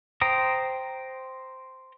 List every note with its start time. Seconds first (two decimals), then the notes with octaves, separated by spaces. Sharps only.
0.21 C5 G5 A#5 D#6